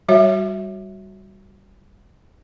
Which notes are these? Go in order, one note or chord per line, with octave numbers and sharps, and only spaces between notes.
G3 F#4 C#5 E5